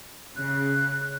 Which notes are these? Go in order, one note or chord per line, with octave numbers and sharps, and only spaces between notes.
C#3 F#6